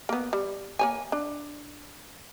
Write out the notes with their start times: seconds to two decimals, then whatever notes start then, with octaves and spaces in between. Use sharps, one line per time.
0.09 A#3 B3
0.33 G3
0.79 A#3 C#5 G#5
1.12 D4